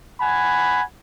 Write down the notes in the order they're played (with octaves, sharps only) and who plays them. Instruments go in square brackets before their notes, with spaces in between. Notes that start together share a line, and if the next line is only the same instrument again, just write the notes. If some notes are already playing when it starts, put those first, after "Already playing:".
[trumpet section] F#5 G#5 B5